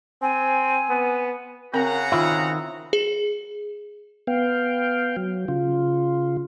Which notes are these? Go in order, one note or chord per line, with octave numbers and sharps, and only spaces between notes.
C4 G#5
B3
C#3 C4 F#4 A#4 F#5 A#5
D#3 C4 E4 F4
G#4
B3 F5 G5
F#3
C#3 F4